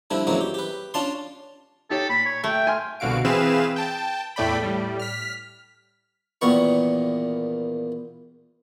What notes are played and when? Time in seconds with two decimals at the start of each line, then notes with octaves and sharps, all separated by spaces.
0.11 D3 F3 G3 C4 E4
0.27 F#2 E3 F#3 G#3 A#3 C4
0.41 G4
0.54 G4 B4
0.94 C#4 D4 F4 A5 C6
1.90 D#4 G4 A4 C#5
2.09 A#2 B5
2.25 C#5
2.44 A3 G5
2.67 G#5 C6 F6
3.00 C2 B2 D3 F#4 F5 D7
3.25 E3 C4 G#4 B4 F5 E7
3.76 G5 A5
4.36 E2 A2 A3 D5 G5 B5
4.63 A2 G3
4.99 F6 B6
6.41 E2 A#2 D#3 B3 C#6